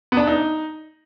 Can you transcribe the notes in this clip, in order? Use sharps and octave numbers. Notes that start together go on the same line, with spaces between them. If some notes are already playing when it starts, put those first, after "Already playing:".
B3
D4
D#4